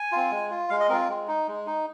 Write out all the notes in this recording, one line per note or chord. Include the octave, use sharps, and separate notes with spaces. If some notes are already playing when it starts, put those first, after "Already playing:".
Already playing: G#5
C4 F4
G#3
F4
G#3 F5
D#5
C4 F4 A#4
G#3
D#4
G#3
D#4